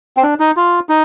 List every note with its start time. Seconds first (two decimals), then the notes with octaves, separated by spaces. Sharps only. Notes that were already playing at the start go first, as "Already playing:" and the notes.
0.17 C4
0.23 D4
0.40 D#4
0.56 F4
0.89 D#4